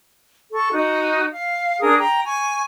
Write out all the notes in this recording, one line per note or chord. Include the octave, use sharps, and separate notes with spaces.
A4 C#6
D#4 F#4
F5
D4 G#4 A#4 D#6
G5 A#5
G#5 C#6